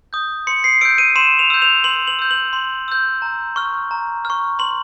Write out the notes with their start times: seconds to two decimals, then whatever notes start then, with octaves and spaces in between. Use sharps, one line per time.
0.13 D#6 G6
0.47 C6 C#7
0.64 C7
0.81 E6 G6 D7
0.98 D#7
1.16 C6 E7
1.39 F7
1.50 E6 G6
1.62 F7
1.84 C6 F#7
2.07 F#7
2.19 E6 G6
2.31 F#7
2.53 C6
2.88 E6 G6
3.22 A#5
3.56 C#6 F6
3.91 A#5
4.25 C#6 F6
4.59 C6 F#7